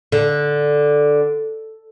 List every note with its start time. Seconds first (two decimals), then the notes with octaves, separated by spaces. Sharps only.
0.12 D3